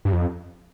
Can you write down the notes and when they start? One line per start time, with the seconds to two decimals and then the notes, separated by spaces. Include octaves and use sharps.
0.05 G2
0.13 F2